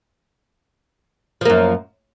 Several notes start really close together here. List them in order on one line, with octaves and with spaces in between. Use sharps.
F3 A#3 F#2